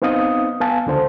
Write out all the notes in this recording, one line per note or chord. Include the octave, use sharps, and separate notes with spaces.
B3 C4 D#4 F5 D#6
B3 F5 G#5 A5
C#2 D3 C5 A5